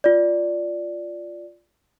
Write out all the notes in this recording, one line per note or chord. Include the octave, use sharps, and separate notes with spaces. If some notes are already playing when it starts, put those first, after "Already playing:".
F4 D5